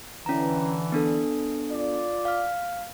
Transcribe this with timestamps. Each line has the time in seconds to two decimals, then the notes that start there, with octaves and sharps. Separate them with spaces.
0.26 D3 E3 C#4 A#5
0.92 B3 D4 A4
1.72 F4 D5
2.25 F5 F6